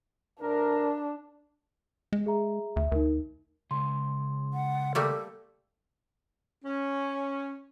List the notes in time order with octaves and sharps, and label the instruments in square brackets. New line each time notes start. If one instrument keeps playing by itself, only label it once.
[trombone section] D2 A#4 [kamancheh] D4
[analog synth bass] G#3
[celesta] G#4 E5 A#5
[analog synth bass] D2 [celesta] E5
[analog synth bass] D2 [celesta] D#4 A#4
[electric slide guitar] C#3 G#3 [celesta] C6
[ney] F#5
[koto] G3 A3 A#3 [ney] A4
[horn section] C#4